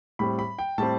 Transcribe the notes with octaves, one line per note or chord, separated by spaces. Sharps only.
A2 G3 C4 B5
B5
G5
A2 G3 C4 A5